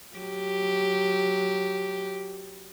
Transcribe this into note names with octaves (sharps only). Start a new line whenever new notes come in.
F#3 G4